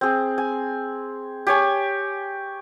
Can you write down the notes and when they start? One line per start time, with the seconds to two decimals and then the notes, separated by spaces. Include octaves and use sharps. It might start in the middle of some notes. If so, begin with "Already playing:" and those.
0.01 C4 G#4
0.38 G#5
1.47 G4 C#5 G#5